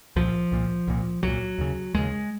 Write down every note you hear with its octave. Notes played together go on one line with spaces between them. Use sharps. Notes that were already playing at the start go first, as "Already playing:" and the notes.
C2 A#2 F3
C2 A#2
C2 A#2
C2 A#2 F#3
D#2 C#3
D#2 C#3 G#3